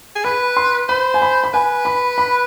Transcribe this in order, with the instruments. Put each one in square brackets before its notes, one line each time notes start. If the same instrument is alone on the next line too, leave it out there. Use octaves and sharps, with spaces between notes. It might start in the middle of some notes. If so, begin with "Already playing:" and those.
[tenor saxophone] G#4
[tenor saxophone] B4 [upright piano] B5
[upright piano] C6
[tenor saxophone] C5 [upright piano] B5
[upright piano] G#5
B5
B5
[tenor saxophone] B4 [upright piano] G#5
[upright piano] B5
B5